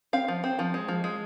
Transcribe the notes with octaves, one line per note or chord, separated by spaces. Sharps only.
C4 F5
F3
C4
F3
G#3
F3
G#3